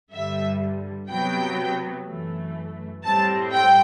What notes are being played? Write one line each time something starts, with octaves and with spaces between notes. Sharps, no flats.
G2 D3 G3 E5
C3 F#3 B3 G5
F#2 E3 A3
A2 G3 C4 A5
G5